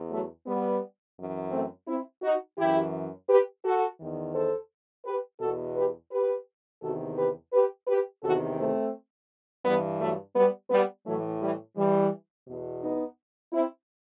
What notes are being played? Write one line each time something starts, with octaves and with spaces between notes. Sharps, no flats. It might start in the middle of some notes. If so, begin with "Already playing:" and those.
Already playing: E2
F#3 A3
G3 B3
F#2 E3
A3 C4
C4 E4
D#4 F#4
F#2 E3 E4 G4
G4 B4
F#4 A4
E2 D#3
A4 C5
G4 B4
E2 B2 F#4 A4
G4 B4
G4 B4
E2 C3 D#3 F#4 A4
G4 B4
G4 B4
G4 B4
E2 C3 D#3 F#4 A4
A3 C4
G2 E3 G3 B3
F#3 A3
G3 B3
G3 B3
A2 E3 F#3 A3
E3 G3
E3 G3
E2 B2
B3 D#4
C4 E4